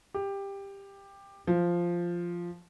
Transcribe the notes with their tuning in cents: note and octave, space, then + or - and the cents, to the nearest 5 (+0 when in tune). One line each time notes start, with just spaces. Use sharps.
G4 +15
F3 -5